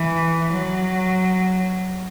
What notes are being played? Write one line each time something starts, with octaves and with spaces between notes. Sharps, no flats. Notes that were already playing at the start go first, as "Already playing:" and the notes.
Already playing: E3
F#3